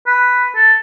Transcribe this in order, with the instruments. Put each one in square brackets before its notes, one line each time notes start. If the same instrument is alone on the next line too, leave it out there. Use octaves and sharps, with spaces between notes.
[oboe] B4
A4